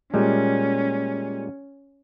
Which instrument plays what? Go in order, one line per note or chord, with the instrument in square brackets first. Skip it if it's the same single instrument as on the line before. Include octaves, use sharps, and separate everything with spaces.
[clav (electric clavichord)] A#2 G3 G#3 [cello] C#4